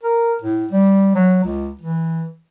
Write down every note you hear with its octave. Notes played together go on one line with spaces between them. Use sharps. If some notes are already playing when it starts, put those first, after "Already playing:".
A#4
A2
G3
F#3
C#2
E3